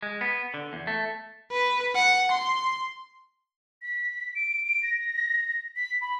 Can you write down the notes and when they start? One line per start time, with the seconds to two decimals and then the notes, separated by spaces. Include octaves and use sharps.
0.03 G#3
0.21 B3
0.54 D3
0.73 E2
0.87 A3
1.52 B4
1.96 F#5
2.31 C6
3.82 B6
4.35 D7
4.66 D7
4.83 A#6
5.76 B6
6.01 B5